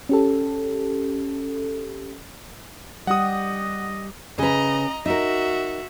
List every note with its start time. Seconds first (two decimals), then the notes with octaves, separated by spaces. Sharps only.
0.09 C#4 G4 A4
3.07 G3 G4 D#5 F#5 D#6
4.38 C#3 B4 D#5 A#5
5.06 D#4 F#4 A#4 E5